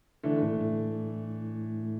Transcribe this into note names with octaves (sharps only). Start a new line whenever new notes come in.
D3 E3 A3 D4
A2
A2